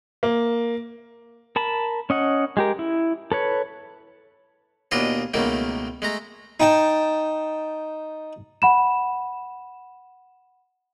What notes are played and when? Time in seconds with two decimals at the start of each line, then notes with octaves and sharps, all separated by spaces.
0.23 A#3
1.56 A#4 A5 B5
2.10 C#4 D#5 F#5
2.57 G#3 G4 A#4
2.79 E4
3.32 A4 B4 C#5
4.91 D#2 B2 D4 F4 D#5 G#5
5.34 C#2 B2 D#3 A3 A#3
6.02 G#3 A3 A#5
6.60 D#4 G5 A5
8.62 F#5 B5 E7